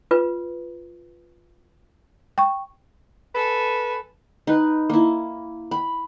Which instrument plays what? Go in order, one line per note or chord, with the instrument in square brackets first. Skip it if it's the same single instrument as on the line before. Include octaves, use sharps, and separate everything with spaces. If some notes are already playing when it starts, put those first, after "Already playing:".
[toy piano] F4 B4
[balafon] G5 C#6
[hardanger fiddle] A4 G#5 [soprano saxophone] B4
[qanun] D#4 B4
A#3 E4
B5